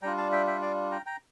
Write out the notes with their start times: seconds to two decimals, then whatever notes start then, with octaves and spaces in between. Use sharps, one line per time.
0.02 G3 D4 F4 G5 A#5
0.17 F5 A5
0.32 E5 G5
0.47 E5 G5
0.62 D5 F5
0.91 G5 A#5
1.06 G5 A#5